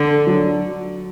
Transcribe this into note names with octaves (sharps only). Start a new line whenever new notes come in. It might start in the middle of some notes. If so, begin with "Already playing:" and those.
Already playing: D3 D4
F#3